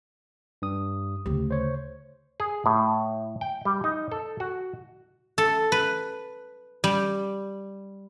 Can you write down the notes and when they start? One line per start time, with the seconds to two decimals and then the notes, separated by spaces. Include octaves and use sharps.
0.62 G2 D#6
1.26 D2 C#3 G4
1.51 C5 C#5
2.40 G#4
2.66 A2
3.41 G5
3.65 G3
3.84 D#4
4.12 A4
4.40 F#4
5.38 A4
5.72 B4
6.84 G3